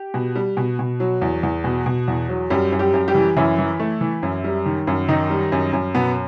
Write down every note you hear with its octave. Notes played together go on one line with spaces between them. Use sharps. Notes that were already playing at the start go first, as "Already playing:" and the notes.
Already playing: G4
B2
G3
B2
B2
F#3
E2
E2
B2
B2
E2
F#3
F#2 G3 G4
F#2
G3 G4
F#2
G3 G4
E3
F#2 E3 E4
E3
A3
E3
F#2
G3
D#3
F#2
D#3 D#4
G3
F#2
F#2
B2 B3